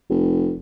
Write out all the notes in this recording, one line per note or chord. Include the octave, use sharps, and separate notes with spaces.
F1